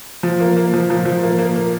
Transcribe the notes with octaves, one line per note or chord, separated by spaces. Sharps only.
F3
A#3
A#3
F3
F3
F3
A#3
A#3
A#3